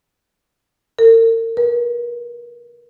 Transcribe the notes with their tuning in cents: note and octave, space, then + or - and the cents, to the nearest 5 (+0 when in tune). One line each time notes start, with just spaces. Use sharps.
A#4 -40
A#4 +45